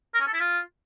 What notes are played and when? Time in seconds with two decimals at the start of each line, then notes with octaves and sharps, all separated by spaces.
0.14 A#4
0.21 C#4
0.27 A4
0.33 E4
0.40 F4